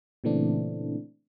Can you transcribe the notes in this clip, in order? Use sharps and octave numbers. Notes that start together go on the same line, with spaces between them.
A#2 C#3 E3 A3 C4 D4